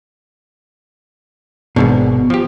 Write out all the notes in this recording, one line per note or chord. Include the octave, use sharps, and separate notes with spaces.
G#1 G#2 B2 D4
F3 G4